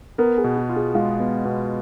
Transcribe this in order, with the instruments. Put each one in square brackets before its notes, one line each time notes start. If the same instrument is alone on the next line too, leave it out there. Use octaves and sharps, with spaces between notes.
[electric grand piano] B3 [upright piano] A#4
[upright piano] G#4
[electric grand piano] B2
[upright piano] F#4
[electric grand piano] F4
[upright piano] G#4
[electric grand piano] G#3 [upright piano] F4
[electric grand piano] B3
B2